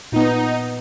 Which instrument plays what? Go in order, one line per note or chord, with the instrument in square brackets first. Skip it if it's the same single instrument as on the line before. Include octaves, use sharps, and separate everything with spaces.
[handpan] A#2 B3 [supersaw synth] D#4